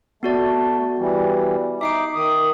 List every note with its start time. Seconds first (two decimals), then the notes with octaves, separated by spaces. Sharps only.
0.23 A3 B3 F#4 D5
0.99 E3 G3
1.81 D#4 E5 D6 C7 D7
2.15 D#3 D#6